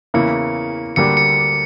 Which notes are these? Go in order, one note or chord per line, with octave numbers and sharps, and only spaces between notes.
E2 C#3 E3 A#3 E4 C#7
D2 D3 G3 A#3 D4 C#7
C#7